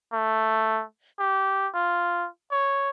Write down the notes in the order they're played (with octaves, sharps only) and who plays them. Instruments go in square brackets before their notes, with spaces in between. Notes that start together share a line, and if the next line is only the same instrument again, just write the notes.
[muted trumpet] A3
G4
F4
C#5